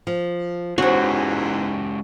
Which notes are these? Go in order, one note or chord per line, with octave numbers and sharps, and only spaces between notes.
F3
E2 G#2 G#3 C#4 F#4 G4 C5 C#5